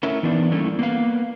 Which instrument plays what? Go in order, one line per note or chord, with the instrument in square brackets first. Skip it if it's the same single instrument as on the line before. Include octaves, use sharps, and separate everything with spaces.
[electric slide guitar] A3 C#4 E4 A#4 E5
E3 B3 D4 D#4
G3 A3 A#3 C#4 E4
A#3 B3 F5